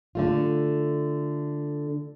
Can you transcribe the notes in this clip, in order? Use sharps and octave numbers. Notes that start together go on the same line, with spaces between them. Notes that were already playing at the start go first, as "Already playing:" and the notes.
D3 A3 F4